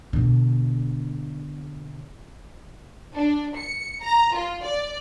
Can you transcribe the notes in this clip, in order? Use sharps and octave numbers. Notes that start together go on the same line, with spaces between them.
B2 D3
D4
C#7
A#5
F4
D5